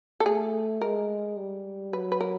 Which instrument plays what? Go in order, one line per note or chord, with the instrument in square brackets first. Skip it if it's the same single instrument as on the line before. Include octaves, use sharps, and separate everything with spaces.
[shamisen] A4
[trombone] A3 [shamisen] G#4
[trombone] G#3 [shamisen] A#4
[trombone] G3
[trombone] F#3 [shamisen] B4
[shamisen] B4
A#4